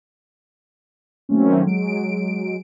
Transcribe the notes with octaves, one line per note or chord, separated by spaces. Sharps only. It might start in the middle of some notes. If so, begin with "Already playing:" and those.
D#3 F#3 A3 A#3 C4 C#4
F#3 G#3 D7